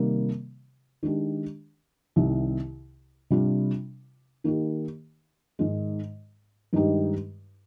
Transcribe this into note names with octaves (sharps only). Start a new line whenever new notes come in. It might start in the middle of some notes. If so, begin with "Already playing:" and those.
Already playing: C3 D#3 G3 A#3
D#3 G#3 D4 G4
C2 C3 D#3
C3 G3 D4 F4
D#3 A#3 D#4 G4
G#2 D#3 G#3
G2 D#3 G#3 D#4 G4